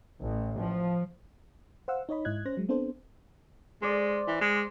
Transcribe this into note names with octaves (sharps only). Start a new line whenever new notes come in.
A1
F3
C5 F5 F#5 E6
D#4 C#5 D#5 B5
G#2 E4 D#5 F#6 G#6
C#4 C5 F#6 A#6
F#3 G#3
B3 C4 D4 A4 C5
G#3 C5 D5
E3
G#3